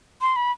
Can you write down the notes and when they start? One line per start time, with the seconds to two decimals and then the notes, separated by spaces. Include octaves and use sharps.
0.21 C6
0.36 B5